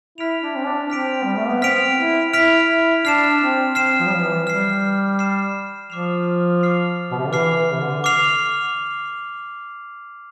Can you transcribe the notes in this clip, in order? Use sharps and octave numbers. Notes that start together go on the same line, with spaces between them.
E4 F6 B6 D7 F7
D4
C4
D4
C4 F6 B6 D7 F7
G3
A3
B3
C4 F6 B6 D7 F7
E4
E4 F6 B6 D7 F7
E4
D4 F6 C7 E7
C4
C4 F6 C7 E7
F3
G3
F3
E3
G3 F6 C7 E7
F6 C7 E7
F3 D6 F6 C7 F7
D6 F6 C7 F7
B2
C3
D3
E3 D6 F6 C7 F7
E3
C3
D3
D6 F6 C7 F7